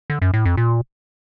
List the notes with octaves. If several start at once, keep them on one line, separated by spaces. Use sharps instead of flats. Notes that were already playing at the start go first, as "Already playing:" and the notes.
D3
F#2
A2
F2
A#2